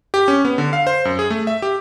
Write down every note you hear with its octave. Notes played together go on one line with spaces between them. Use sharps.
G4
C#4
B3
D3
F5
C5
F#2
G#4
A3
E5
G4